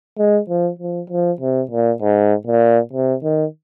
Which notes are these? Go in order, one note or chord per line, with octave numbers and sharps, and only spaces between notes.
G#3
F3
F3
F3
C3
A#2
G#2
A#2
C3
D#3